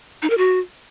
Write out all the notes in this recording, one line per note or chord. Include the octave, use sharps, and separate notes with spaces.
D#4
A#4
F#4